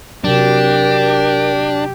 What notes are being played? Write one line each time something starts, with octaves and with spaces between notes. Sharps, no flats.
C3 F#3 D4 G4 A#4